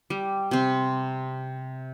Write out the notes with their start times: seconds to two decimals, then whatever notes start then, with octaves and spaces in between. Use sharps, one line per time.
0.10 G3
0.51 C3 C4